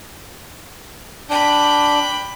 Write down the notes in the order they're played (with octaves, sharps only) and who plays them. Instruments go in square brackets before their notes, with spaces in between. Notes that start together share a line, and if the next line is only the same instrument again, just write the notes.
[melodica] D4 [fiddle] G5 B5